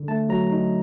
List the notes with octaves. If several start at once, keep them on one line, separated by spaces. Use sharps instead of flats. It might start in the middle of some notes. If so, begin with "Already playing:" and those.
Already playing: D3
A3 A5
F#3 A#5
D#4